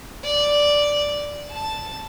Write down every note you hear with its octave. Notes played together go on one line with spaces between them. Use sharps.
D5
A5